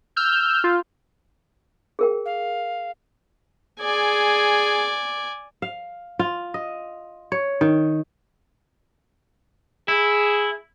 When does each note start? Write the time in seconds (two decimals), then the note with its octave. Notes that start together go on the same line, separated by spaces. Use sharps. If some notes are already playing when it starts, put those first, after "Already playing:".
0.16 E6 F6 G6
0.64 F4
1.99 G#4 A#4 G5
2.25 F5
3.80 G#4 D5 G#5
5.62 F5
6.19 F4
6.54 D#5
7.32 C#5
7.61 D#3
9.88 E4 G#4